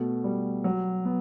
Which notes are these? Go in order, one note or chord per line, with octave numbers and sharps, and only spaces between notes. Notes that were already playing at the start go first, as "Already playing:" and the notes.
Already playing: B2 A3
G3
F#3
B3